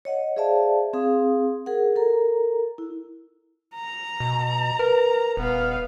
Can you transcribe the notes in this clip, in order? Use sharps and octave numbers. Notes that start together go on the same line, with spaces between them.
C#5 D#5 F#5
G#4 C5 D5 E5 F5 A5
C4 G#4 F5 D#6
G#4 A#4 F#5
A4 A#4 A#5
E4
A#5
B2
A#4 B4
D#1 B3 F5